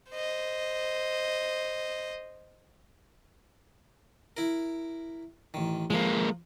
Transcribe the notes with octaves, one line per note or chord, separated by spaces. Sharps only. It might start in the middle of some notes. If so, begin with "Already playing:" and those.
C5 D#5
E4 A#4
A1 D#3
F3 G#3 A#3